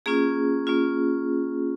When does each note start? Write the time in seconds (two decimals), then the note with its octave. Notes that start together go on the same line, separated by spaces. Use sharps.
0.06 A#3 C#4 F4 G#4
0.67 A#3 C#4 F4